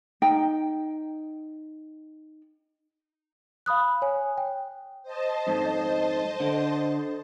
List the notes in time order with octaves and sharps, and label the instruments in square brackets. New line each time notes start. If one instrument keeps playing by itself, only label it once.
[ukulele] D#4 G5
[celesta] F5 B5 D#6 F#6
C#5 G#5
G5
[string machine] C5 D#5 A5
[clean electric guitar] F2 G#2
D3